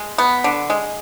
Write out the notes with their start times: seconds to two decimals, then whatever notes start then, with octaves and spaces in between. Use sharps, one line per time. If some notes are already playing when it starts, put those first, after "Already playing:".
Already playing: G#3
0.18 B3
0.44 D3
0.70 G#3